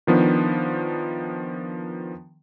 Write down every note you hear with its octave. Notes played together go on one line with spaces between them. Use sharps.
D#3 F3 B3 D4